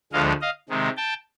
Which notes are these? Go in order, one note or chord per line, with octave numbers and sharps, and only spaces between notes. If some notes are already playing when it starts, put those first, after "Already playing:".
D2 D3 F3 G#3 D#5 F5
D#5 F5
C3 D#3 G#3
G5 A5